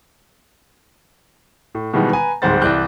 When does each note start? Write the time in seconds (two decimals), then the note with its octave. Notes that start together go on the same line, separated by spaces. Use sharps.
1.75 A2
1.93 B2 D#3 E3 G3 G#3 B3
2.11 B4 G#5 A#5
2.42 D1 G#2 G3 C5 F#5 A6
2.61 C2 E3 D5 D6 F#6 G6